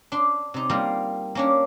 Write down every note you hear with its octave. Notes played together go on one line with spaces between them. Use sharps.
D4 C6
C3 D#4
G3 A#3 D#4 F4
A#3 C#4 D4